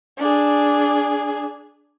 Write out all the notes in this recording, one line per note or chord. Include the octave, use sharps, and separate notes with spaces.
D4 G#4